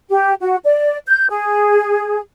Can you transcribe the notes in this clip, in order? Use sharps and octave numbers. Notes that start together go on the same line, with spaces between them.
G4
F#4
D5
G6
G#4